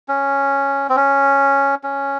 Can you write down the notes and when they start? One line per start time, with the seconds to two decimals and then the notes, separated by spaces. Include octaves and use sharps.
0.08 C#4
0.89 C4
0.96 C#4
1.84 C#4